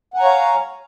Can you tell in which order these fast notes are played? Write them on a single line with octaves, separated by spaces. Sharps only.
F#5 G#5 A#5 C#5 F5